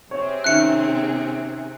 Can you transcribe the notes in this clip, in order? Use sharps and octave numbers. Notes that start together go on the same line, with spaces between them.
C3 C4 G#4 C#5
D#3 C#4 E5 F#6 C#7